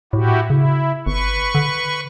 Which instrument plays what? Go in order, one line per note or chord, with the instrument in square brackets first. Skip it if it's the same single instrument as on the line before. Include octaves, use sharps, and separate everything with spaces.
[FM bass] A2 [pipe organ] E4 F#4 G4
[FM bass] C#3 [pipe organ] E4
[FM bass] G1 [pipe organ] B4 C#6
[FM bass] D3